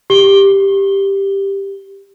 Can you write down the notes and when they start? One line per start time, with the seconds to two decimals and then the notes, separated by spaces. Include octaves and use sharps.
0.10 G4 G7